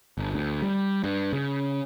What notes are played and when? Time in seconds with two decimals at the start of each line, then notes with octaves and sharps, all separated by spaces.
0.18 G1
0.34 D2
0.62 G3
1.04 G2
1.33 C#3